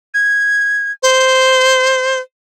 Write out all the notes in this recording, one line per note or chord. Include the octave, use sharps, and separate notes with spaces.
G#6
C5